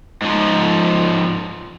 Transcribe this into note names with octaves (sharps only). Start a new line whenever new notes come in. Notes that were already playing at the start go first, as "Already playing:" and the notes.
G#2 F3